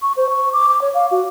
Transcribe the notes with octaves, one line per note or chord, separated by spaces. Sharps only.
C#6
C5
C#6
D6
D6
C#5
F5
F#4